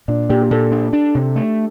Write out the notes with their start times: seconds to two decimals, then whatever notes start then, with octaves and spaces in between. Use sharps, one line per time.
0.08 A#2 D4
0.29 A#2 G4
0.42 G4
0.51 A#2 A4
0.72 D4
0.93 D4
1.15 C3
1.36 A3